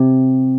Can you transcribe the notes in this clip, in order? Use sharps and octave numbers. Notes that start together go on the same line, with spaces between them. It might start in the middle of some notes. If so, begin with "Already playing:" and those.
Already playing: C3